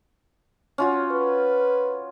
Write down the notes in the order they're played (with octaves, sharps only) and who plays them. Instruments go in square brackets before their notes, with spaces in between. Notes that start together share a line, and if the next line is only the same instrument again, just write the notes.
[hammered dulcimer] C#4 F4 F#4
[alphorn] B4